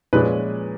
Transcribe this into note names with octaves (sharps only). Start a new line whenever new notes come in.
A#2 F3 G#3 C#4 B4